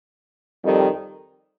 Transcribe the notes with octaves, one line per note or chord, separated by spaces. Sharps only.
F2 D#3 G3